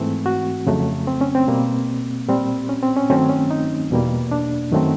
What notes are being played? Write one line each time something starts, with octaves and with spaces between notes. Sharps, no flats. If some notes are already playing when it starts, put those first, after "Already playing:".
Already playing: G#2 E3 A3 C4
F#4
F2 C#3 F#3 A3
C4
C#4
C4
B2 G3 A#3
A#2 G3 C4
C#4
C4
C#4
G2 D#3 F#3 A3 C4 C#4
C#4
D#4
E2 B2 G3 A#3
D4
F#2 D#3 F#3 A3 C4